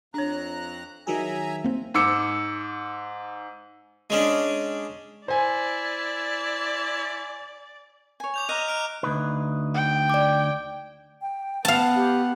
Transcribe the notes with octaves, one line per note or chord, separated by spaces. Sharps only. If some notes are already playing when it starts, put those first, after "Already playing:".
F2 D4 C#5 A#5 F#6
D#3 F#3 G#4 E5 G#5 A#5
A#3 C4
G#2 D6 E6 C#7
G#3 C#4 D4
E4 C5 D5 G#5
C#5 G#5
D6 G6 F7
D#5 A#5 D6 F6 F#6
F6 D7
D2 D#4 B4
G5
D5 D6
G5
B3 F5 F#5 A5
G4